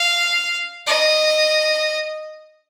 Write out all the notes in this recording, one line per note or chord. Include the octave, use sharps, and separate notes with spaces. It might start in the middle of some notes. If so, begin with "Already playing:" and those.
Already playing: F5
D#5